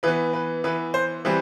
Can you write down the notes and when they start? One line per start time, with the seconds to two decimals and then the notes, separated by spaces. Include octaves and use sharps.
0.03 E3 B3 B4
0.33 B4
0.64 E3 B3 B4
0.94 C5
1.25 E3 G3 C4 B4